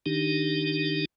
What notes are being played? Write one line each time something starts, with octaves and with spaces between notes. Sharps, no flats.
D#3 D4 D#4 G4